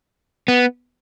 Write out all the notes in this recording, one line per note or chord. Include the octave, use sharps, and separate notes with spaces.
B3